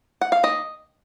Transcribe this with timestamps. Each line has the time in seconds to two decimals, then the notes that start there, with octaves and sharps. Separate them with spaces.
0.21 F#5
0.32 F5
0.43 D#3 A#3 D#5